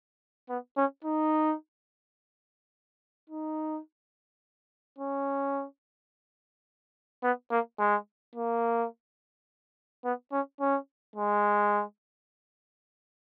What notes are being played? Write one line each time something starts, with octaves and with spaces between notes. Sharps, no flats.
B3
C#4
D#4
D#4
C#4
B3
A#3
G#3
A#3
B3
C#4
C#4
G#3